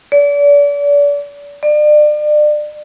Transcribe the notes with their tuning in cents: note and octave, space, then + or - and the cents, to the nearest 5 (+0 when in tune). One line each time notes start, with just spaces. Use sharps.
D5 -35
D5 +35